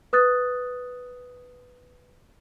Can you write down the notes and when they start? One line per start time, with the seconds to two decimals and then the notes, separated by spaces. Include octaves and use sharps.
0.13 B4 D#6 F#6 A6